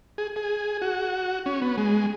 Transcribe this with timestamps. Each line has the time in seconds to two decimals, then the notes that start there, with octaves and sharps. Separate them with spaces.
0.18 G#4
0.36 G#4
0.82 F#4
1.46 C#4
1.62 B3
1.78 G#3